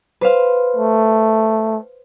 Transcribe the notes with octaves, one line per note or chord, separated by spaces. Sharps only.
B4 C5 F5
A3